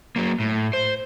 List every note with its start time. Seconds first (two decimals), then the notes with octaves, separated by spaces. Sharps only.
0.16 F#3 A#3
0.40 A2
0.73 C5